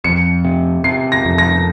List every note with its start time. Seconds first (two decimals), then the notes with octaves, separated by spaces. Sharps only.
0.04 F2 C#7
0.45 C3
0.84 C3 C7
1.12 A#6
1.25 F2
1.38 A#6